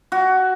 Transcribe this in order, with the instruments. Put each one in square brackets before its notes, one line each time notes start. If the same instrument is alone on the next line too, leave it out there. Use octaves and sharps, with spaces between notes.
[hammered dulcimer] F#4